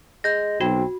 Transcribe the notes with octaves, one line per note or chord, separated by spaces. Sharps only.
G#3 G6 A#6
B1 C4 F#4